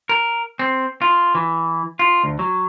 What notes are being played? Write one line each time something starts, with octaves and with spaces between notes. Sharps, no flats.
A#4
C4
F4
E3
F4
D2
F#3